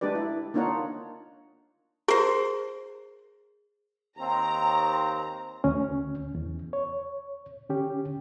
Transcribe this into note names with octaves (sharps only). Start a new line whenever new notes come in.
G#3 D4 G4 B4 D5
E4
A#3 D4 D#4 F4 C#5 F#5
G#4 A#4 C5
D#2 C4 A#5
D2 C#4
E2
C#5
D3 C#4 G4